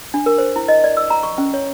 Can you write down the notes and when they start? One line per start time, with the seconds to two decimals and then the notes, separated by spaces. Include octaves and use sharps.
0.14 D4
0.26 A#4
0.38 C5
0.56 E4
0.68 D#5
0.84 D5
0.97 E6
1.10 A#5
1.23 C#6
1.38 C#4
1.54 C#5